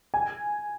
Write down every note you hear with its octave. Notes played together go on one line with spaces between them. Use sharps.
G#5